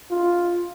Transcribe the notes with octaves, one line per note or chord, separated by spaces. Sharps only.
F4